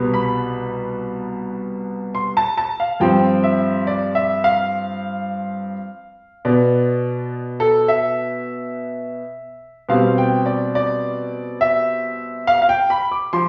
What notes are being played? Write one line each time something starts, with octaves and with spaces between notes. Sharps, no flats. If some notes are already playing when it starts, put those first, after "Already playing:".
Already playing: C2 B2 G3 B3
B5
C6
A5
A5
F5
G2 F3 C4 G5
E5
D5
E5
F5
B2 B3 D5
A4
E5
B2 G3 C4 F5
G5
D5
D5
E5
F5
F5
G5
B5
D6
F3 C6